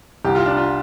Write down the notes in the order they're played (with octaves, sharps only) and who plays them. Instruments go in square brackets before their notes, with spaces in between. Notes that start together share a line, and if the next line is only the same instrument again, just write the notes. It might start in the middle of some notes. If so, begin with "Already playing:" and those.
[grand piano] C2 [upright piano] G4
[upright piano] F4
D4
F4